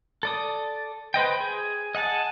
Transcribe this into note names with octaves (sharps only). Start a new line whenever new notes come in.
A4 D5 D#6
B4 C5 D#5 G5
G#4
D#5 F#5 G#5 A5